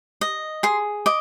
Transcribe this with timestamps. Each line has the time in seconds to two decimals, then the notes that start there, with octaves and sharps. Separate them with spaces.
0.21 D#5
0.63 G#4 C6
1.06 D#5 D6